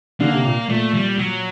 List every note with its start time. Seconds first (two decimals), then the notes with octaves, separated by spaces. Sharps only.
0.20 D3 A#3
0.32 C3
0.45 A#2
0.69 A#2 A3
0.94 G3
1.18 F#3